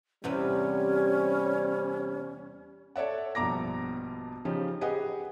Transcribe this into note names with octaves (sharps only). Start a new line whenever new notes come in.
E2 C3 G3 C#4 B4
A4 C#5 D5 E5 F#5
A#1 G2 B2 A#5 D6 A#6
C#3 F3 C#4 D#4 G4
G4 G#4 B4 D#5 F#5